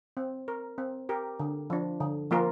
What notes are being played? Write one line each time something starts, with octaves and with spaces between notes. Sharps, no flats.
C4
A#4
C4
G4 A#4
D3
F3 D4
D3
F3 A#3 F4 A#4